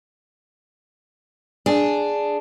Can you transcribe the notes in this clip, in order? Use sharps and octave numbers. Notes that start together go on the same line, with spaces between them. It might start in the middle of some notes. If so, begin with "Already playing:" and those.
D4 G#4